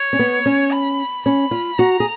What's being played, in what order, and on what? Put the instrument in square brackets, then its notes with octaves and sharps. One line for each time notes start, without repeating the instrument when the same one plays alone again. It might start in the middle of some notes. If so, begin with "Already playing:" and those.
Already playing: [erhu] C#5
[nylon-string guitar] C#4
B3
C#4
[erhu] B5
[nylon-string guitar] C#4 [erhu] B5
[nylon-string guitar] F4
[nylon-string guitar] F#4 [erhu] A#5
[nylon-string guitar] G#4